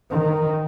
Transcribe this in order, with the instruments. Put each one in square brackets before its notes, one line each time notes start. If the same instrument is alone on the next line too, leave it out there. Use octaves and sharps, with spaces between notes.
[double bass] D#3